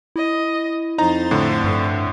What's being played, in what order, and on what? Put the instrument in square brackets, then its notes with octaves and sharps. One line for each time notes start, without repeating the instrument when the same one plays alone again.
[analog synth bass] E4 [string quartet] D#5
[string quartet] F2 C5 A6 [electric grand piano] D#4 A#5
[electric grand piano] A2 D3
[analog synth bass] G2